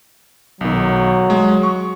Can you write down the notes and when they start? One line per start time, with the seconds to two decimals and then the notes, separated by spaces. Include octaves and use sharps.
0.61 B1 D#3 F#3
1.30 G#3
1.63 C#6